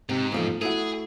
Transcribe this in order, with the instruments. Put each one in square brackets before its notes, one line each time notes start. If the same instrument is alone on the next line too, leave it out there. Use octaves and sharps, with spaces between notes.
[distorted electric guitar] G#2 [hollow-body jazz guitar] C3
[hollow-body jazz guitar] E2 F3 A3
[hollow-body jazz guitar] A3 E4 F#4 [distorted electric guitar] G#4